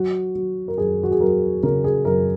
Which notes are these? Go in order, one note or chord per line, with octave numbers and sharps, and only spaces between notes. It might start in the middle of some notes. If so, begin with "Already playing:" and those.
Already playing: F#3 F#4
F#3
A#4
F#2 G#4
F#4
G#4
F#3 A#4
C#3 A#4
G#4
F#2 A#4